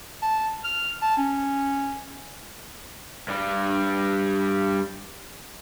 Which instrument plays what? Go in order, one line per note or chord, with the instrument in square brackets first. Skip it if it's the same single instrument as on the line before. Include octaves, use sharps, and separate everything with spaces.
[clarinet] A5
F6
A5
C#4
[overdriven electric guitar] G2 G3